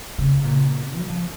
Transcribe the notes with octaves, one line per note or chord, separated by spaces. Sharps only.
C#3
A#2
F#3
F3